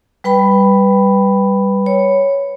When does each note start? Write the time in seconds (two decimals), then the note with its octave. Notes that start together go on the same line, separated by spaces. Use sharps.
0.24 G3 B4 G5 B5
1.86 C#5